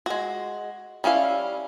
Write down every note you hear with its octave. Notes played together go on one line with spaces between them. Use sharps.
G#3 F#4
G3 C#4 E4 F5